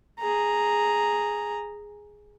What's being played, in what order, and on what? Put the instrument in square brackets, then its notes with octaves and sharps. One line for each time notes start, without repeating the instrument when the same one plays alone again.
[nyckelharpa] G#4 A#5